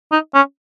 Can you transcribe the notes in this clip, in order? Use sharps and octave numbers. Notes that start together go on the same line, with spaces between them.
D#4
C#4